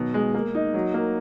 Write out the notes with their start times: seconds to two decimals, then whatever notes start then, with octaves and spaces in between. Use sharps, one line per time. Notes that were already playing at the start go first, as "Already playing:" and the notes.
Already playing: B2 D#3 F#3
0.14 G#3
0.34 A#3
0.55 D#4
0.74 F#3
0.94 A#3